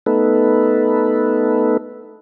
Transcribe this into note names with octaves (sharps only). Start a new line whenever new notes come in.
A3 B3 D#4 A4 B4